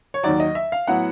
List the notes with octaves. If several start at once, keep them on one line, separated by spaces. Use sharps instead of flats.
C#5
D#2 D#3 F#3 D5
D#5
E5
F5
A2 F#3 B3 E4 F#5